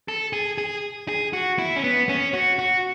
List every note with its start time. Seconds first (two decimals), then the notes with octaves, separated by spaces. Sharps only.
0.08 A4
0.33 G#4
0.58 G#4
1.08 G#4
1.33 F#4
1.59 E4
1.76 C#4
1.84 B3
2.09 C#4
2.34 F#4
2.59 F#4